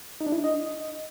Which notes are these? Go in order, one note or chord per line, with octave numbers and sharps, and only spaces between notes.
D#4
D4
E4
D4
D#5